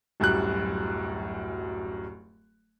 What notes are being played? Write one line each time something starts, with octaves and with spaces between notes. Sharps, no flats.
D1 F#2 G3 F#6